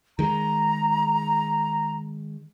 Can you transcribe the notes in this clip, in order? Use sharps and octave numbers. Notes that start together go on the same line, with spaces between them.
D#3 G#3 A#5